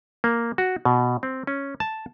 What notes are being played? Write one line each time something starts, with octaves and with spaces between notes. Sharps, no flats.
A#3
F#4
B2
C4
C#4
A5